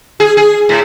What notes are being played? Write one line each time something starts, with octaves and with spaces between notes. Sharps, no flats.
G#4
G#4
A2